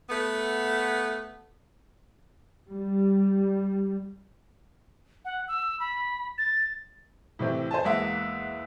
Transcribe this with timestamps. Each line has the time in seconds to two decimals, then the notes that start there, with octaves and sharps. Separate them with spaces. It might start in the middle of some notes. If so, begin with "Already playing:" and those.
0.10 A3 B3
2.68 G3
5.25 F#5
5.48 E6
5.80 B5
6.38 A6
7.39 A2 C3 E3 C4
7.71 C5 G#5 A5
7.84 E2 G#3 A#3 E5 F#5